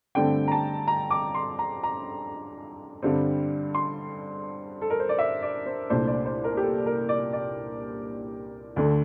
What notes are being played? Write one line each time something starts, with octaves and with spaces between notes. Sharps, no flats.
G2 D3 A3 C4 G5
A#5
A5
A#5
D6
C6
A#5
A#5
G2 D3 G3 C4
C6
A4
A#4
C5
D5
E5
D5
C5
C2 A#2 A3 D4 C5
D5
C5
A#4
G4
A4
A#4
D5
D5
D2 D3 A3